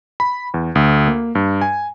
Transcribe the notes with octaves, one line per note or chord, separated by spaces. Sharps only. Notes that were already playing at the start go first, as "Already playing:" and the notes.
B5
E2
D2
A#3
G2
G#5